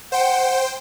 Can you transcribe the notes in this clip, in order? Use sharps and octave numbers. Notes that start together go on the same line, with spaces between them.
C5 F#5 G5